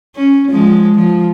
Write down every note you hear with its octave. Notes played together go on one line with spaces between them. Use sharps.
C#4
F3 G#3
F3